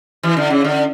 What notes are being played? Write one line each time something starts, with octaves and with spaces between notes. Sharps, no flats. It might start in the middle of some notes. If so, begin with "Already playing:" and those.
E3
D3
C#3
D3